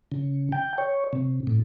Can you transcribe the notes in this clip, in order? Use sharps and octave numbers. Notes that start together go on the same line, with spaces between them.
C#3
G5
C#5
C3
A2